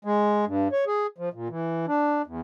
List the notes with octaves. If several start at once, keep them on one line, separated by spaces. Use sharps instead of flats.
G#3
G2
C#5
G#4
F3
A#2
E3
D4
E2